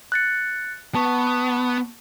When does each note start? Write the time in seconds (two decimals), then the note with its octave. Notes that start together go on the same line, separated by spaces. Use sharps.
0.12 F#6 A6 C#7
0.95 B3 A5 C#6